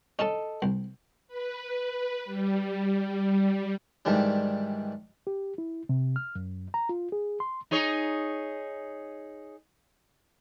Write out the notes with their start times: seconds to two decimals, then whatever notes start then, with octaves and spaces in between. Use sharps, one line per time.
0.19 C#4 D4 A4 D#5 A5
0.62 C2
1.28 B4
2.25 G3
4.05 G#2 D#3 E3 G3 D4
5.27 G4
5.58 E4
5.89 C3
6.16 F6
6.36 F#2
6.74 A#5
6.89 F4
7.12 G#4
7.40 C6
7.71 D#4 G#4 C#5